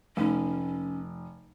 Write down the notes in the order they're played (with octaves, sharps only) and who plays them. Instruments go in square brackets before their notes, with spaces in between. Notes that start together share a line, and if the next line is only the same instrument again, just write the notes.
[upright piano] F1 [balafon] A3 D#4 [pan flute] C#4